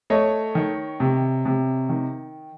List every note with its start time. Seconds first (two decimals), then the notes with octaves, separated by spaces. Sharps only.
0.10 A3 C#5 D#5
0.55 D#3
1.00 C3
1.45 C3
1.89 D#3